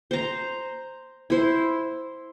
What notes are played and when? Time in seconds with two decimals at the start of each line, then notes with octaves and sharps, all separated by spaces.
0.11 C5 A#5
1.30 E4 C5